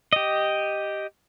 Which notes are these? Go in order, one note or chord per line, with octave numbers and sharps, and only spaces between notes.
G4 D#5